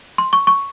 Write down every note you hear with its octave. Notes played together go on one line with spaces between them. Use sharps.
C6
C#6
C#6